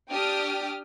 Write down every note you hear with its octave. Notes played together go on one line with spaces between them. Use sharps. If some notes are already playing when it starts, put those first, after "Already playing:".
D4 G4 G5 D6 D#6 F6